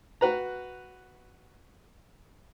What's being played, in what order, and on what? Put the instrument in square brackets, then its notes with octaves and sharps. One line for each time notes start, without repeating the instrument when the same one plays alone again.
[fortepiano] F#4 B4 A#5